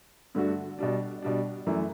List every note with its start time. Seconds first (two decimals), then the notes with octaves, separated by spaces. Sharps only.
0.34 G2 D3 A3 D4 F#4
0.79 B2 G3 D4
1.22 B2 G3 D4
1.66 F#2 E3 A3